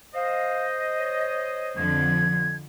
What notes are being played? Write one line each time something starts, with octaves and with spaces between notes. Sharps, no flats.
C5 D#5 F5
C#5
F2 D3 F3 G#6